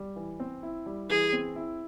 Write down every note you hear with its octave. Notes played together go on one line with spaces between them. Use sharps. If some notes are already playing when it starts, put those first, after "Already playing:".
Already playing: G3
E3
C4
E4
G3
E3 G#4
C4
E4